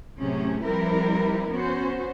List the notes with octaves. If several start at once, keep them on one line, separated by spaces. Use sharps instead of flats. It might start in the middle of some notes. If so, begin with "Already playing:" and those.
A2 C3 F#3 A3 C#4 G#4
F3 G3 C4 E4 A#4 B4
B3 C#4 F#4 C5